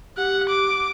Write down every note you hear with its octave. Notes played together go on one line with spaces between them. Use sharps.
G4 F#5
D6